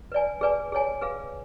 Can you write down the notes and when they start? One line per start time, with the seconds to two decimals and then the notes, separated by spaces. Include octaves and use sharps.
0.12 B4 D5 G#5
0.41 G#4 B4 D5 G#5
0.72 G#4 C#5 G#5
1.01 G#4 B4 F5